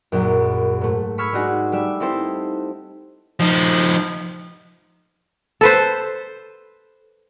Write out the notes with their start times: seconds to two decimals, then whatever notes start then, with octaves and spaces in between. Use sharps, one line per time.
0.12 A#1 F#2
0.81 G#2 A3
1.18 B5 C#6 E6 F6 G#6 B6
1.32 G#3 D4 D#4 F#4 G#4
1.72 G3 A3 D5 E5
2.00 C4 D#4 E4 G4 A4 C5
3.40 F3 D#4
5.61 A4 B4 C5